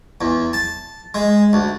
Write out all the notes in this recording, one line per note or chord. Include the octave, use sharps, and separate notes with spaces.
E2
A5
G#3
D2